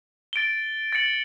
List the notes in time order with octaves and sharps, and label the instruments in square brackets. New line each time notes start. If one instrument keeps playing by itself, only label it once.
[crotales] A6 D7 G7
A6 C#7 F#7